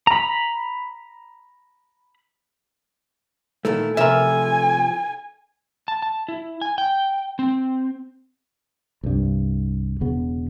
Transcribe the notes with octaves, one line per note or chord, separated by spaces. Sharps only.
A#5 B5
A#2 D#3 A3 E4
C3 E3 F3 A#4 E5 G#5
A5
A5
E4
G#5
G5
C4
C2 G2
E1 C#3 B3